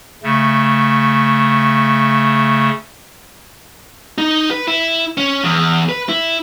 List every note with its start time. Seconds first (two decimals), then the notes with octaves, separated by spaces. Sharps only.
0.23 C#3 A3
4.18 D#4
4.51 B4
4.68 E4
5.18 C#4
5.44 E2
5.89 B4
6.09 E4